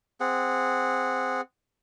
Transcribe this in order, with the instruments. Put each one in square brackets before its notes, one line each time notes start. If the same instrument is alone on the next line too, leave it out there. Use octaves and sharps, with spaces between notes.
[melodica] C4 G#4 F#5